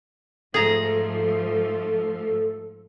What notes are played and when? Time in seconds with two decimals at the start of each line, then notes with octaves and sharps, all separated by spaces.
0.54 G#2 F3 A3 G#4 A4 A#5